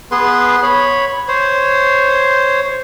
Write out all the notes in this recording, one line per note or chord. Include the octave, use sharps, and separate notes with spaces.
B3 G#4 B4 C6
C#5 B5
C5 C#5